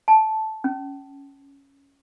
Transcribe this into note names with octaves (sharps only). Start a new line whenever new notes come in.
A5
C#4